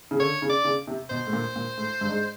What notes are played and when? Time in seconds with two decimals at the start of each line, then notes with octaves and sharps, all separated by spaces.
0.11 C#3
0.19 D3 C#5
0.42 C#3
0.50 D5
0.64 C#3
0.87 C3
1.10 B2 C5
1.27 A2
1.33 A#2
1.56 A#2
1.78 A2
2.01 G2
2.09 G#2